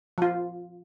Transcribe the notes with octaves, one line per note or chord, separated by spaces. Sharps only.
F3 F4